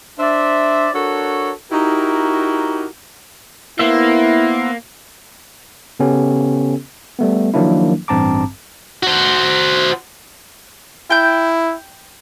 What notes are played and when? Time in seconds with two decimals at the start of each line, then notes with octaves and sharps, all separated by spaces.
0.19 D4 C5 D5 E5
0.94 D4 F#4 A4 A#4 C#5
1.71 D#4 E4 F#4 G4 A#4
3.79 A#3 B3 E4 C5 E5
6.00 C#3 B3 C#4 G4 A4
7.19 G3 A3 B3
7.54 D#3 F3 F#3 A#3 D4 E4
8.08 A1 G2 C4 A5 A#5 D6
9.03 F#4 C5
11.10 E4 G5 G6